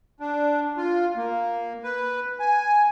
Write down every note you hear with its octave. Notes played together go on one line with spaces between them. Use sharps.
D4
F4
A#3
B4
G#5